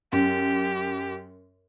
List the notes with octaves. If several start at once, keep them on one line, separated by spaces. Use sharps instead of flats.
F#2 G4